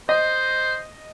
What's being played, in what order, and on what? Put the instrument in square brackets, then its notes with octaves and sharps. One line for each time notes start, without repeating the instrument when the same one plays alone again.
[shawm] C5 [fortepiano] D#5